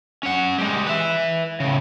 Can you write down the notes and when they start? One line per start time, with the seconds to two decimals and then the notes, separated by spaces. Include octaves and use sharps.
0.23 C#4 F#5
0.58 G3 G#3
0.86 B4 E5
1.60 A2 C#3